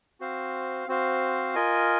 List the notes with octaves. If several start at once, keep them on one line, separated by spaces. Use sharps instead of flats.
C4 F#4 C5 F5
C4 F#4 C5 F5
F4 A#4 D#5 G#5